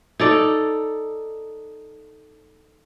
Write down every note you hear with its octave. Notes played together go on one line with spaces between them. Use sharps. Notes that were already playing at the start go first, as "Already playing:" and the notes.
D#4 A4 D5